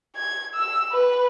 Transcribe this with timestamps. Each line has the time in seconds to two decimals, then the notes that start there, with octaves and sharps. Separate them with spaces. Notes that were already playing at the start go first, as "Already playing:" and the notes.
0.16 G#6
0.55 E6
0.92 B4